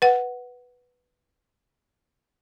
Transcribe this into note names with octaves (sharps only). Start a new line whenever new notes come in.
B4 F#5